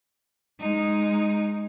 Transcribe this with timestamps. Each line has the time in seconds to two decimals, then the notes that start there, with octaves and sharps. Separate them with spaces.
0.59 G#3 D#4